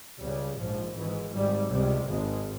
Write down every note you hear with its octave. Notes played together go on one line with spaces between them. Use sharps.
C#2 C#3 G3
A#1 G#2 F3
G#1 G#2 E3
G#1 G#2 G3
C#2 C3 G3
G#1 G#2 G#3